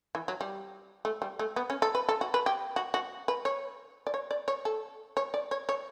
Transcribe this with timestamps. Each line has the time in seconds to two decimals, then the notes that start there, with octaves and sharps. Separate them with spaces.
0.15 E3
0.28 F#3
0.41 G3
1.05 A3
1.22 G3
1.39 A3
1.56 B3
1.70 C#4
1.82 A4
1.95 B4
2.09 A4
2.21 F#4
2.34 B4
2.46 G4
2.76 F#4
2.94 F#4
3.28 B4
3.45 C#5
4.07 D5
4.14 C#5
4.31 D5
4.48 C#5
4.65 A4
5.17 C#5
5.34 D5
5.51 C#5
5.69 C#5